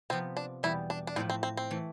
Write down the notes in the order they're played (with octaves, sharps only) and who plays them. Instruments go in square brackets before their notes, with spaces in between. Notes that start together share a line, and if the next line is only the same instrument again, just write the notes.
[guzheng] C3 F3 B3 [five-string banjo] C4
[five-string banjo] D4
[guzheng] E2 B2 G3 [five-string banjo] E4
[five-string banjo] D4
D4
[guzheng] A2 F3 A3 E4 [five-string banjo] C4
[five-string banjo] C4
C4
C4
[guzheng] E3 A3